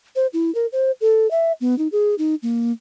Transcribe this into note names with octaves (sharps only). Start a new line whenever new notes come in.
C5
E4
A#4
C5
A4
E5
B3
D#4
G#4
D#4
A#3